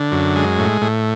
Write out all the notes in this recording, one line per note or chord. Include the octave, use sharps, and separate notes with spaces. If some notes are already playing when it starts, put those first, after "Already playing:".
Already playing: D3
F#2
G#3
A2
A2